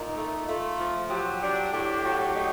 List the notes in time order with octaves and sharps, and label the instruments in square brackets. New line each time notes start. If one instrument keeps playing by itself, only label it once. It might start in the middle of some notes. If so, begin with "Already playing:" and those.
Already playing: [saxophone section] A#2 [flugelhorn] D#4
[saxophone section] A3
[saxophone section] A3 [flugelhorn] F4
[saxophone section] F3
[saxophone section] F#3 [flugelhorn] G4
[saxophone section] D4 [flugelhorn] G4
[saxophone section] A2 [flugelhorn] G4
[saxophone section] F#3
D#4